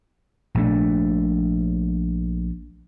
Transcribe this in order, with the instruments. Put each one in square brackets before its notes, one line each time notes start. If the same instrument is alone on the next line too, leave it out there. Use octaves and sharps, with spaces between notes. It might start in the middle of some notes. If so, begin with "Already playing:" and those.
[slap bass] A#1 A3 D4